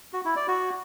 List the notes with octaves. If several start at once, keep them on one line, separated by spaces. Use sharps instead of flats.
F#4
E4
D5
F#4